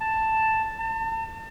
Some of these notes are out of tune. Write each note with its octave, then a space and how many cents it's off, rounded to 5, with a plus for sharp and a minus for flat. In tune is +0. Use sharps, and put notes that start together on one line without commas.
A5 +5
A5 +35